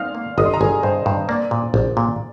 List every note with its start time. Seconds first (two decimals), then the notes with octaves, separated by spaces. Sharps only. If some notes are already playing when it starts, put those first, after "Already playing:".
Already playing: D#4 F5 F6
0.15 A#3
0.38 G1 D#5 D#6
0.45 C6
0.54 A#5
0.60 G1 G#4 G#5
0.83 G2 C5
1.06 G2
1.28 A#3 D5
1.51 A#2
1.74 A#1
1.97 A#2